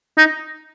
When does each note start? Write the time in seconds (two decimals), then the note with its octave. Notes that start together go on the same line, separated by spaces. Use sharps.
0.18 D#4